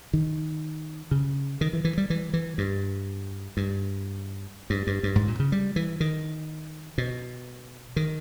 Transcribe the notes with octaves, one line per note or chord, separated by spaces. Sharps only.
D#3
C#3
D#3
E3
E3
G3
E3
E3
G2
G2
G2
G2
G2
G#2
A#2
C#3
G3
E3
D#3
B2
D#3